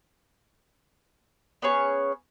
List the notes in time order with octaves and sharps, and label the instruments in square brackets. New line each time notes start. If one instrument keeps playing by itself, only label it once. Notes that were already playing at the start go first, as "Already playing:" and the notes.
[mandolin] B3 C#4 G#4 C#5